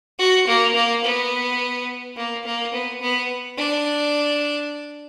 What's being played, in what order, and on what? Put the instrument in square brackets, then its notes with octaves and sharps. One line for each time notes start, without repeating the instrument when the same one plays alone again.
[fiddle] F#4
A#3
A#3
B3
A#3
A#3
B3
B3
D4